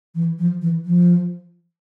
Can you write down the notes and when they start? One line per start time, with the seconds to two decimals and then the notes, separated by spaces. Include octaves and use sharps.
0.15 E3
0.39 F3
0.62 E3
0.85 F3